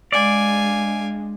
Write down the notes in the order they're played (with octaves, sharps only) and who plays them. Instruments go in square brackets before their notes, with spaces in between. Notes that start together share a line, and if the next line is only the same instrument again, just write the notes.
[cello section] G#3 D4 [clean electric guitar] D5 [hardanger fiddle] F5 G#5